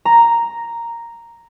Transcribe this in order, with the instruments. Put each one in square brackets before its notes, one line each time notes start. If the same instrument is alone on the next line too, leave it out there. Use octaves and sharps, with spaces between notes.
[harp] A#5